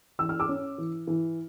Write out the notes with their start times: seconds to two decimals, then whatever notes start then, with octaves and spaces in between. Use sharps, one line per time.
0.19 E3 E6
0.29 F6
0.40 D6 E6
0.49 C#4
0.78 E3
1.07 E3